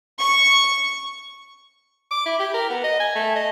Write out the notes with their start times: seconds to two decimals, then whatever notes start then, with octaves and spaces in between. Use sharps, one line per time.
0.19 C#6
2.11 D6
2.26 E4
2.39 G4
2.54 A#4
2.70 B3
2.84 D#5
3.00 G#5
3.15 A3
3.36 D#5